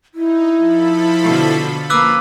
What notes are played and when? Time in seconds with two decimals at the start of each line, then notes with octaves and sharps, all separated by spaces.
0.14 D#4 E4
0.57 F3 A4 B5
1.23 B2 D3
1.90 F3 A#3 C#4 B4 D6 E6 F#6